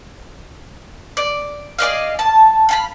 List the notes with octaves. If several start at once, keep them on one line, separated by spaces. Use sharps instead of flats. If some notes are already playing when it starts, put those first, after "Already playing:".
D5
G#4 D5 D#5 F5
A5
F5 A5 B5